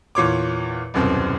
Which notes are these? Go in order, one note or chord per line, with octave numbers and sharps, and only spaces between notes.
E2 A#2 C#5 D6
D#1 C2 F#2 B2 C4